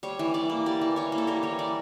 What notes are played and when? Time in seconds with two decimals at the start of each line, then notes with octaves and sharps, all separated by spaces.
0.03 G3 C#5
0.19 E3
0.34 E3 D5
0.50 A#3
0.66 G3 D5
0.81 E3
0.96 E3 C#5
1.12 A#3
1.18 A4
1.27 G3 A#4
1.43 E3 C#5
1.59 E3 D5